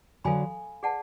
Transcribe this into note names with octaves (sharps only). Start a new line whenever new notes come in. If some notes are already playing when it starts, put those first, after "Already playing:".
D3 F#3 A4 F5 G#5 B5
G#4 D5 F#5 A5